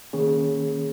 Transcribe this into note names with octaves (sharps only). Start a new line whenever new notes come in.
D#3 A#3 C#4 G#4 C#5